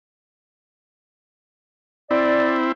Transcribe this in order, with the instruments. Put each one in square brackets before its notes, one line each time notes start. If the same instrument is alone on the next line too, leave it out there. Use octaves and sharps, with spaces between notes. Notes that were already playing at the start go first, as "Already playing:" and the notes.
[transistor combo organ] C4 E4 [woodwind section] D5